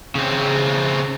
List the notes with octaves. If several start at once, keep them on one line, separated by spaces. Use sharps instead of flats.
C#3 C4